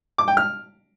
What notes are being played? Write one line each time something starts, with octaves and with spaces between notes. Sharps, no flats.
D6
G5
F6